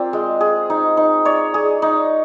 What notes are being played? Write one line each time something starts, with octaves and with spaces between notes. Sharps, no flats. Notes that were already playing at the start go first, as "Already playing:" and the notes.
Already playing: C4 F4 A#4 D5
G#3
G#4
D#4
D#4
C#5 D5
G#4
D#4